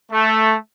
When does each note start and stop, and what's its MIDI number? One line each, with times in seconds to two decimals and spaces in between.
0.12 0.55 57